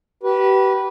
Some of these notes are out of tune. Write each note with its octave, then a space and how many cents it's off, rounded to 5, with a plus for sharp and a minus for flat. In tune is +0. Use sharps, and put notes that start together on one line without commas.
G4 -35 B4 -15